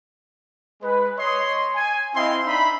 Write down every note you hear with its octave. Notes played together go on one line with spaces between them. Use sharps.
G#3 B4
C#5 D#5 C6
G#5
C4 E4 D#5 F5 G5 C6
D4 D#4 E5 B5